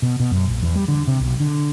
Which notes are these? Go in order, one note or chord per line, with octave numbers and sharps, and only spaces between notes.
B2
B2
F#2
A#1
E2
G3
D3
C3
B1
D3